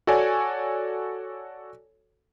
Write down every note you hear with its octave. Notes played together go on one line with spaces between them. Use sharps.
F#4 A4 C#5 D5 G#5